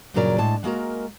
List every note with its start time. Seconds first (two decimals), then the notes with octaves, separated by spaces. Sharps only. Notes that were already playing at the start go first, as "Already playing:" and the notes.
0.14 G2 A#2 C#3 F#3 A#4 D5
0.38 A2 G#3 A5
0.64 G#3 A#3 F#4 A#4